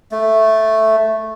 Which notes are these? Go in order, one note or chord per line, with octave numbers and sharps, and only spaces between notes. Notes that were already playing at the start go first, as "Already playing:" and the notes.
A3